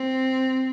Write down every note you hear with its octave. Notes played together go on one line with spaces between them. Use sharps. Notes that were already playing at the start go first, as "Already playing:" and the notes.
Already playing: C4